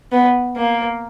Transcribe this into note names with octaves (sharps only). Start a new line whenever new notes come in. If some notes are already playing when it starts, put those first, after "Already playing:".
B3
A#3